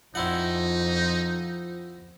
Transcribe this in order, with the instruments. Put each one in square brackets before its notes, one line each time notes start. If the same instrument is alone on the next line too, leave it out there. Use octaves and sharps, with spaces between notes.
[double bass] F2 [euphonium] F3 [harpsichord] C4 E4 F#5 [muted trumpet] D#4